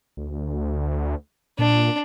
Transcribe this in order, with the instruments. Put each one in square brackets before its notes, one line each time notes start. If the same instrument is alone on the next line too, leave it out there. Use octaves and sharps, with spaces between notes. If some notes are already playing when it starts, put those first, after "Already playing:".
[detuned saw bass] D2
[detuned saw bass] A#2 [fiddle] D4